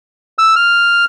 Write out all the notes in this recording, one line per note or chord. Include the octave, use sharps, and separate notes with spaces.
E6
F6